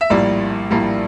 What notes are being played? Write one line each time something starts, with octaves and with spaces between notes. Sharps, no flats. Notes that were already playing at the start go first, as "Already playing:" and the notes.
E5
A#1 A2 G3 A#3 D5
A#1 A2 G3 A#3